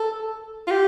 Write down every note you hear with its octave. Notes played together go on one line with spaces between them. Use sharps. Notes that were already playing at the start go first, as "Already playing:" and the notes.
Already playing: A4
F4
G4